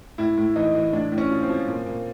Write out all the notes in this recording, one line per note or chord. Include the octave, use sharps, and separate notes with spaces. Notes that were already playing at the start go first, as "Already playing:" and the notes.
A2 E4
A2
E3 D#4
E3
A2 D4
A2
C#4
F3
C4
F3
A#2
A#2